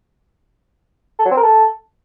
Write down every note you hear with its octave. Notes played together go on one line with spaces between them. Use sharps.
A4
F#3
C4
A#4
A4